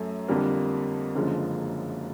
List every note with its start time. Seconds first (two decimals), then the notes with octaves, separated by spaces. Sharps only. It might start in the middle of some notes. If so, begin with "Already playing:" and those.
Already playing: F#2 F#3 A3
0.28 F2 D3 G3 A#3
1.15 F#1 F#2 D3 F3 G#3